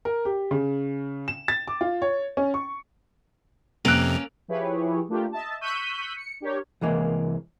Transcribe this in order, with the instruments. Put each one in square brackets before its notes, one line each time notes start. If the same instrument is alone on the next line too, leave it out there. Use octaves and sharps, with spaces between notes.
[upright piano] A#4
G4
C#3
E7
A6
D6
F4
C#5
C#4
C#6
[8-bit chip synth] F2 C3 [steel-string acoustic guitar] A#3 C#4 [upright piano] F#6 D7 F7
[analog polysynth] F3 E4 G4 G#4 B4 C#5
A3 A#3 D4 F4 G4
D#5 E5 A5
C#6 E6 F#6 G6 B6 D#7
C#7
D4 G4 A#4 C#5
[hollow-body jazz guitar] C2 E3 G#3 A#3